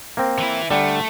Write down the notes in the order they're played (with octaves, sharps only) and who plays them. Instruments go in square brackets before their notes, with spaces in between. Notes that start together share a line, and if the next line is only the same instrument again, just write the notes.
[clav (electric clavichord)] A#3 C4
[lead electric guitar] E3 E4
[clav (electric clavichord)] D3 G3 [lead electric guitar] A3